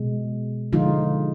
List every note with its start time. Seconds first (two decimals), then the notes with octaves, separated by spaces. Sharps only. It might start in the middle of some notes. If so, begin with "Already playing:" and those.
Already playing: B2 G#3
0.73 D3 F3 G#3 D#4 F4